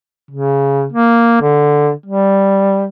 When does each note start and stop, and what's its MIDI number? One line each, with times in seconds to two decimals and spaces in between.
0.31 0.87 49
0.92 1.39 58
1.41 1.91 50
2.06 2.87 55